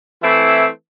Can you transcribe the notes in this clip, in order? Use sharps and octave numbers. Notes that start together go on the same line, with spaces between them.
E3 A3 C4 E4